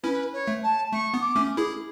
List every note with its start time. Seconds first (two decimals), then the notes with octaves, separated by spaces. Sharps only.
0.03 C#4 E4 B4
0.33 C#5
0.47 A3
0.63 A5
0.92 A3 C#6
1.14 B3
1.21 D6
1.35 A3 C#4
1.57 E4 G#4